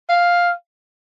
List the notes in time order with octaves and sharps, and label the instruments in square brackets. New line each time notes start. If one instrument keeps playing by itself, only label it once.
[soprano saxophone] F5